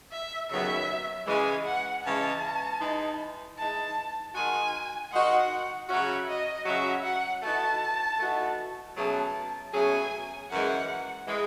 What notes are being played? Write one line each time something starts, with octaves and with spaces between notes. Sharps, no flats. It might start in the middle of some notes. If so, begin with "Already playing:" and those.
E5
D#2 C#3 F#3 B3 E5
C#3 E3 G#3 G#5
F#5
C#3 E3 G#3 A5
E3 G#3 D#4
E3 G#3 D#4 A5
D#3 G#3 D#4 F#4 G#5
D#3 G#3 D#4 F#4 F#5
C#3 F#3 C#4 F#4 E5
D#5
C#3 F#3 C#4 F#4 E5
F#5
E3 A3 D#4 F#4 A5
E3 A3 D#4 F#4
B2 F#3 A3 C#4 G#4 A5
B2 F#3 A3 C#4 G#4 G#5
F#2 E3 G#3 F#5
E3 G#3